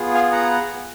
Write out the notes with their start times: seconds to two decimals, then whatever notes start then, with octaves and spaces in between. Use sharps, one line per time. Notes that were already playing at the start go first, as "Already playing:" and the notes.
Already playing: B3 F4 G#4
0.14 F5 G#5
0.32 F#5 A#5